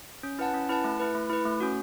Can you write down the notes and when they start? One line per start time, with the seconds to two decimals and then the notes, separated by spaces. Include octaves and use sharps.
0.23 C#4
0.39 E4 B4 F#5 A5
0.54 C#4
0.69 E4 B4 F#5 A5
0.84 A3
0.99 E4 B4
1.15 A3
1.30 E4 B4
1.45 A3
1.60 C#4 F#4